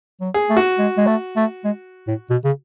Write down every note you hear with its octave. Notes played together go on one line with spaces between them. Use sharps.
F#3
G#4
A3
F#4
G#3
G#3
A3
A3
G#3
A2
B2
C#3